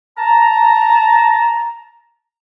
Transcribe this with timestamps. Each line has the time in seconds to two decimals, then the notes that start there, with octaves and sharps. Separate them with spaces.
0.18 A5 A#5